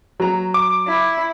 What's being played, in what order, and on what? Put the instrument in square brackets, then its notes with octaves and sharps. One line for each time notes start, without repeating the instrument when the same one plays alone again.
[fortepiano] F#3 A#5
[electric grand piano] D6
[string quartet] E4